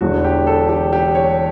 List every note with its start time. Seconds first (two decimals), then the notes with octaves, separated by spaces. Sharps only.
0.01 E1 E2 D3 F#4
0.24 G4
0.47 A4
0.69 G4
0.93 G4
1.15 C#5